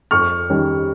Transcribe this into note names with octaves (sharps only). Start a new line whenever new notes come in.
F2 C#6 F6
D#3 G3 C#4